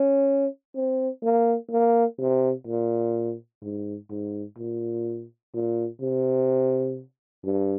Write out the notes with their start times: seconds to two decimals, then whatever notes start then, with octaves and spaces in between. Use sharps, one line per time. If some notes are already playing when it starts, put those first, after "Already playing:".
Already playing: C#4
0.75 C4
1.23 A#3
1.71 A#3
2.18 C3
2.67 A#2
3.63 G#2
4.10 G#2
4.58 A#2
5.54 A#2
6.02 C3
7.45 G2